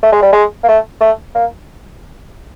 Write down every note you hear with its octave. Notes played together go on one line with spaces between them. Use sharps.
A3
G#3
G3
G#3
A#3
A3
A3
A#3